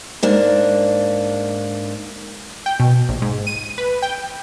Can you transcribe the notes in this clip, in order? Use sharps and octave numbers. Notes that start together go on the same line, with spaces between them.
G#2 A#3 D4
G5
B2
A#1
G#2
D#7
B4
G5